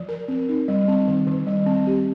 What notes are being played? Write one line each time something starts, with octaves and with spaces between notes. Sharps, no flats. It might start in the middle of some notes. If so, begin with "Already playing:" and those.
Already playing: F3
A#4
C4
D#4
G3
C4
D#3
D#3
G3
C4
G4